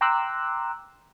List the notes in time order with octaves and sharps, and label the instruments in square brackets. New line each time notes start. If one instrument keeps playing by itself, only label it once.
[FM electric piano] G5 A#5 C6 D6 E6 F#6